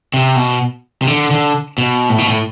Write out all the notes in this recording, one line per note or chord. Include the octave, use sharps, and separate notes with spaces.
C3
B2
C3
D3
D3
B2
A2
B2
A2